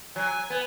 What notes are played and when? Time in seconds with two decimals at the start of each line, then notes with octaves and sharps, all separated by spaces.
0.16 F#3 G#5
0.50 B3